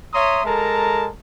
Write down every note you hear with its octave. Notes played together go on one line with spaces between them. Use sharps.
C#5 E5 A#5 C6 D#6
G#3 A4 A#4 A5 A#5